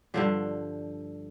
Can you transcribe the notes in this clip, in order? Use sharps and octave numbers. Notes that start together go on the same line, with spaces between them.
G2 D3 F3 D4